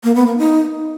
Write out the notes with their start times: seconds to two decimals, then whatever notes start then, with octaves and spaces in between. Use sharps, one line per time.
0.04 A#3
0.15 B3
0.27 A#3
0.38 D#4